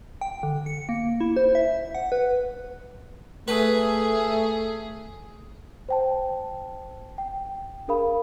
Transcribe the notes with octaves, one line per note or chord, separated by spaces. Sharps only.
G5
D3
C#7
A#3
E4
C5
E5
F#5
B4
A3 G#4 B4
C5 G5 A5
G5
D4 G#4 A#4 F5 B5